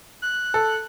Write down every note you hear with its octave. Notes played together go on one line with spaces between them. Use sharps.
F#6
A4